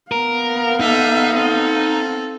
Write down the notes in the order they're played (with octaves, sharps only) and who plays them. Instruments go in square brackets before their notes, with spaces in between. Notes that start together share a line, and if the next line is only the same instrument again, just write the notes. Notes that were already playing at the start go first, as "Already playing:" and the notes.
[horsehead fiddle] B3 F5 [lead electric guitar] A#4
[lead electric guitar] D#4 [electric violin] A4 E5
[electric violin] C4 A4